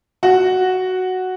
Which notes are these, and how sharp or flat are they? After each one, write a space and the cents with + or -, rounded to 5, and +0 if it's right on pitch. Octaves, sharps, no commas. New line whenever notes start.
F#4 +0